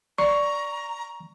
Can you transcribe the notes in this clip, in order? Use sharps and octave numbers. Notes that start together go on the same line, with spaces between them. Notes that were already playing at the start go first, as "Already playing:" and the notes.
D5 A#5 C#6